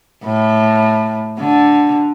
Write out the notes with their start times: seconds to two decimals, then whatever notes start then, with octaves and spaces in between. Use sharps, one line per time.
0.24 A2
1.38 D3